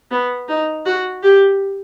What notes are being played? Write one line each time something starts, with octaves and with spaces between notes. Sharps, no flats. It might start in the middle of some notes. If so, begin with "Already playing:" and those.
B3
D#4
F#4
G4